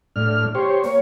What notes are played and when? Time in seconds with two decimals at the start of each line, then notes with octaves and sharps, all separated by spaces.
0.16 A2 D4 F6
0.55 G4 C5 C#5
0.84 A#3 C#5